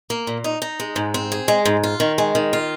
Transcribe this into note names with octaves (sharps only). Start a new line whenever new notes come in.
A#3
A#2
D#4
D#4
G#3
G#2
C4
G#4
G#3
G#2
F4
D#3
G#3
D#3
F4